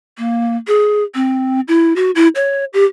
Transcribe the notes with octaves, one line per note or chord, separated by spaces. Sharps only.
A#3
G#4
C4
E4
F#4
E4
C#5
G4